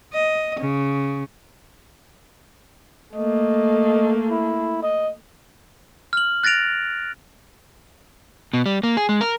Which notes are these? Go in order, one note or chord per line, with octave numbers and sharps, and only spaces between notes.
D#5
C#3
A3 A#3 D#5
E4
D#5
F6 F#7
F#6 A6 A#6 D7 F7
B2
G3
A#3
G#4
G#3
A#4